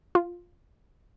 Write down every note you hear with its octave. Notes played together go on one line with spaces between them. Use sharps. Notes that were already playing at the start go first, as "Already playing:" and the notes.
F4